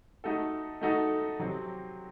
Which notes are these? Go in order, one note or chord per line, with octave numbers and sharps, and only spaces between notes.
A3 D#4 F#4 A4
A3 D#4 F#4 A4
C3 F#3 C4